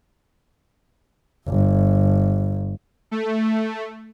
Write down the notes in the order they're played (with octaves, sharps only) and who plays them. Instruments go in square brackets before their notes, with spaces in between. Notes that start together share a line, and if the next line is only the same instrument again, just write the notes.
[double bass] G1
[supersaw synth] A3